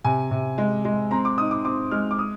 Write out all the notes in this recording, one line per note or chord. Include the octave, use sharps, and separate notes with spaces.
C3 G#5
C3
G#3
G#3
C4 A#5
D6
D#4 D#6
D6
C4 D6
G#3 F6
D6
D#6